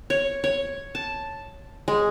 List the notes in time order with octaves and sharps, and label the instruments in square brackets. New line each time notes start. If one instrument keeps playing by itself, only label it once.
[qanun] C#5
C#5
A5
G#3